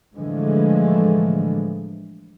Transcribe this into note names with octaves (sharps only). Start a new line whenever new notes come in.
A2 D3 E3 F3 G#3 A3